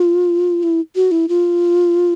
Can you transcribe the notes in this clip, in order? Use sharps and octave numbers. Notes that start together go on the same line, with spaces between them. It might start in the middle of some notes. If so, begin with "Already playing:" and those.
Already playing: F4
E4
F#4
E4
F4